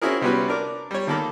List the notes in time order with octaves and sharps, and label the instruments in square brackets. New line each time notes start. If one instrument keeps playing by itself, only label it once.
[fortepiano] C4 C#4 E4 F#4 G#4 A#4
C3 G3 B3 C#4 F#4 B4
D4 A#4 D6
G3 C#5
D#3 A#3 A4 A#4 B5 D6